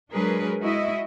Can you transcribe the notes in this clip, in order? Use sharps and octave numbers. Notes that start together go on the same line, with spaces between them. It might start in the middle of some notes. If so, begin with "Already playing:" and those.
F#3 G#3 D4 G#4 A#4 B4
G#3 E4 F#4 D#5 E5